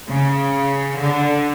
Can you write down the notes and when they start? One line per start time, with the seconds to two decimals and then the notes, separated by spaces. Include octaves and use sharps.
0.08 C#3
0.99 D3